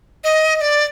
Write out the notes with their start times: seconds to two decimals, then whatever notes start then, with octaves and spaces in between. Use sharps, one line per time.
0.24 D#5
0.56 D#5
0.61 D5